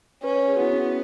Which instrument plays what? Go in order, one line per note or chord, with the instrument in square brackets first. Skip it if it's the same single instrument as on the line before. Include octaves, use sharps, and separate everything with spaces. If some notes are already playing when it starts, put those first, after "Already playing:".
[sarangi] C#4 [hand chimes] B4
[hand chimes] C#5
G#4
F#4
[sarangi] B3 [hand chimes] E4
[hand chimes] C#4